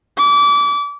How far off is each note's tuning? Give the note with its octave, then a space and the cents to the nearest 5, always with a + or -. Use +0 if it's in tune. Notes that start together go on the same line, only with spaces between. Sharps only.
D6 -30